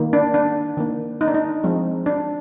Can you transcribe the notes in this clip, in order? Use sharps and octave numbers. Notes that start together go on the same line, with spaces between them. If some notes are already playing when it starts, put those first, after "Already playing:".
Already playing: D#3 A#3
D4
D4
D#3 A#3
D#4
D4
D#4
F3 G#3 C4
D4